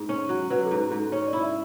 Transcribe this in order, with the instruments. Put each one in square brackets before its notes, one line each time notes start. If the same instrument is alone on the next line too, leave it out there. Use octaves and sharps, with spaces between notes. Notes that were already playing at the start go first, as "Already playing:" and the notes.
Already playing: [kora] G#2
C#4
F#3
[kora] F#3 [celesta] B4
[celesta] A4
[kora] G#2
G#2
[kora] C#4 [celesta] C#5
[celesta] D5
[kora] E4
[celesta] E5